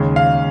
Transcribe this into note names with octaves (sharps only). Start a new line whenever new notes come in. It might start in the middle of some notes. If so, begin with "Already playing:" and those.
Already playing: D#2 C#3 G#3
F5